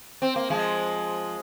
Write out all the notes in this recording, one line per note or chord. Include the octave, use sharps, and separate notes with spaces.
C4
A#3
F3 G#3